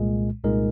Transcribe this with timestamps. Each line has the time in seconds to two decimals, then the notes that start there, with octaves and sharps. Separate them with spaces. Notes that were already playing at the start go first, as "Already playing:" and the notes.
Already playing: C2 A#2 G#3
0.43 C2 A#2 G#3 D#4 A#4